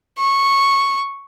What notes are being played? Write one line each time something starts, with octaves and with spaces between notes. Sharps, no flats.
C#6